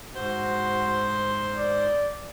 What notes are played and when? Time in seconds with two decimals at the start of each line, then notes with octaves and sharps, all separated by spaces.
0.15 G#2 F#4 C5 C6
1.58 D5